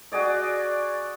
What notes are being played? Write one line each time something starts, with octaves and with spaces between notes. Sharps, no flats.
F#4 G#4 D5 D#5